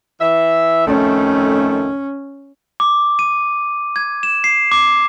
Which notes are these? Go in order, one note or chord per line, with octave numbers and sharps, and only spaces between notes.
E3 E5
F2 D#3 A3 C#4
D6
D#7
G#6
E7
C7
D6